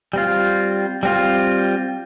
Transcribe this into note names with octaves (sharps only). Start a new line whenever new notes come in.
G3 C4 F4
G3 C4 F4